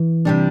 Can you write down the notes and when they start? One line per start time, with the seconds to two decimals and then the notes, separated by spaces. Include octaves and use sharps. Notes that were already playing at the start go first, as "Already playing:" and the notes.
Already playing: E3
0.25 C3 G3 D4